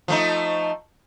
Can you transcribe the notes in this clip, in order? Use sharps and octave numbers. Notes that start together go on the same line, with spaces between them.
F3 A3 D#4